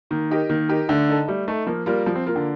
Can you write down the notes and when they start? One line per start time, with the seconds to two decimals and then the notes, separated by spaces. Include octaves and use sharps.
0.11 D#3 A#3
0.31 D#4 G4 A#4 D#5
0.49 D#3 A#3
0.69 D#4 G4 A#4 D#5
0.89 D3 A3
1.09 D#4 A4
1.28 G3 A3
1.47 A3 D#4 A4
1.67 F3 A#3
1.86 G3 A#3 F4 A#4
2.06 F3 G3
2.15 C4
2.26 A#3 F4 A#4
2.36 D3